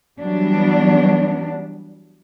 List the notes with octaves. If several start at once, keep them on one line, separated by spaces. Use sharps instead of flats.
E3 F#3 G3 B3 D4